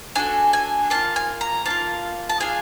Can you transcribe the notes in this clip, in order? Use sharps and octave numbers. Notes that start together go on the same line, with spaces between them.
D4 F#4 A4 G#5
G#5
A#3 D4 F4 A5
G#5
A#5
A#3 D4 A5
F4
A5
D4 F4 G#4 G#5